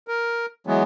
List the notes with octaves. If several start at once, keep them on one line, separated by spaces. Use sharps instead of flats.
A#4
E3 F#3 G#3 B3